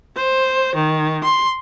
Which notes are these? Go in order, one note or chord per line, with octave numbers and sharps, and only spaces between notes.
C5
D#3
C6